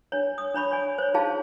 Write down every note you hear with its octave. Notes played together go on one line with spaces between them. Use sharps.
D4 C#5
D#6
D4 C#5 B5 C#6
C#5 D5 G#5
C5 C#5
D#4 F4 G#4 F5 A5